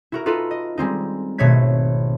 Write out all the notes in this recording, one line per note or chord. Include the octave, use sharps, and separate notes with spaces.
E4 F#4 A#4
D#4 F4 F#4 A4 B4
D#5
G3 G#3 C4 D#4
G#1 B2 A3 C#5 G#6 B6